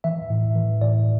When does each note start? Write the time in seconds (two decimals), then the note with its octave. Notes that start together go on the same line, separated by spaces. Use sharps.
0.04 E3 E5
0.30 A2
0.56 E3
0.81 A2 D5